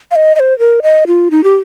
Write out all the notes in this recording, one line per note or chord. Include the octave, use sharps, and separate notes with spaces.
F5
D#5
D#5
C5
A#4
D#5
F4
D#4
G4